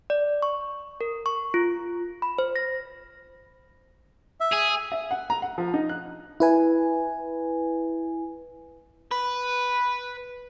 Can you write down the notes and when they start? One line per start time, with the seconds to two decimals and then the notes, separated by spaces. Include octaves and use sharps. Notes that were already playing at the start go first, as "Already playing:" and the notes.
0.10 D5
0.42 C#6
1.01 A#4
1.26 C#6
1.54 F4
2.22 B5
2.38 C5
2.56 A#6
4.40 E5
4.53 G#4
4.92 E5
5.11 F#5
5.30 A#5
5.42 F#5
5.58 F3
5.74 D#4
5.89 F#6
6.40 E4 B4 G#5
9.11 B4